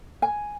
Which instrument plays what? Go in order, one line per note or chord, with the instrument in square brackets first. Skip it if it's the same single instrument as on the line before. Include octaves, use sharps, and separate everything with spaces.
[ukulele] G#5